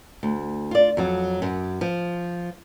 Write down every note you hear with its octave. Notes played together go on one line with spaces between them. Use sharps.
D2
F4 D5
F2 F#3
F#2
F3